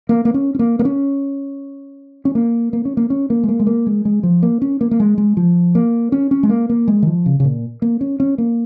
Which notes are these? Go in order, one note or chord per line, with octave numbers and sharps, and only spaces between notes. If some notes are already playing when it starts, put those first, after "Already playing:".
A#3
A#3
C#4
C#4
A#3
A#3
C#4
C#4
A#3
A#3
C#4
A#3
C#4
A#3
G#3
A#3
G#3
A#3
G#3
G#3
F3
A#3
C#4
A#3
A#3
G#3
G#3
F3
A#3
C#4
C#4
G#3
A#3
A#3
G#3
D#3
F3
C#3
C#3
A#2
A#3
C#4
C#4
A#3